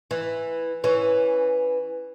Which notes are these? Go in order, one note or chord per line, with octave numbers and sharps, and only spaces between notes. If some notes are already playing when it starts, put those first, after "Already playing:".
E3
E3 C#4